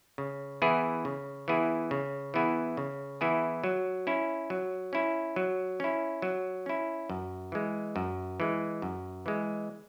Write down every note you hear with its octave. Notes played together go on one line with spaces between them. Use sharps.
C#3
E3 B3 E4 G#4
C#3
E3 B3 E4 G#4
C#3
E3 B3 E4 G#4
C#3
E3 B3 E4 G#4
F#3
C#4 E4
F#3
C#4 E4
F#3
C#4 E4
F#3
C#4 E4
F#2
E3 G#3
F#2
E3 G#3
F#2
E3 G#3